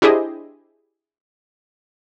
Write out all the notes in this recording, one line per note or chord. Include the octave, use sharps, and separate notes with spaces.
D4 E4 G4 G#4 C5 D#5